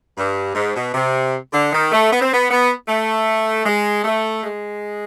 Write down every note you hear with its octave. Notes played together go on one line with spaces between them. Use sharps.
G2
G#2
B2
C3
D3
D#3
A3
B3
C4
B3
B3
A3
G#3
A3
G#3